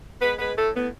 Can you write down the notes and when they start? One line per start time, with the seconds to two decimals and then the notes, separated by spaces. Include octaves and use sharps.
0.21 G#3 B3 B4
0.39 G#3 B3 B4
0.57 A2 A3 A4
0.74 A2 B3